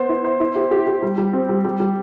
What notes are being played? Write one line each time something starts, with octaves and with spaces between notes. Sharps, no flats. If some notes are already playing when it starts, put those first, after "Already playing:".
Already playing: B3 C5
E4
C5
E4
G4
G4
G4
G3
G3
C4
G3
G3
G3